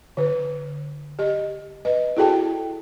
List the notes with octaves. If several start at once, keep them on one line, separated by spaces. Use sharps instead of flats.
D3 B4
G4 D#5
B4 D#5
E4 F#4 G#4 A4 G5 A5